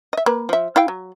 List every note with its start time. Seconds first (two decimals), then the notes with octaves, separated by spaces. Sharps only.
0.13 D#5 E5
0.26 A#3 B4
0.49 F3 E5
0.76 E4 F5 G5
0.88 F#3